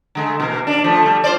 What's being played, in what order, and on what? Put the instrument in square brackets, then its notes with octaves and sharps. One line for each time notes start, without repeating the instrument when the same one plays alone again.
[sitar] D3 G#3 A3
B2 E3 A#3
D4 D5
F3 A3
G3 A3
F4 C5 D5